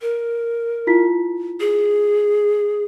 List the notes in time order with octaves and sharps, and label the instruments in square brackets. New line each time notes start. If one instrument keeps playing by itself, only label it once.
[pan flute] A#4
[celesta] E4 F4 B6
[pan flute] G#4